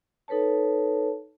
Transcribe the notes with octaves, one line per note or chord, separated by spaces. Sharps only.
D#4 A4 B4 C#5 A5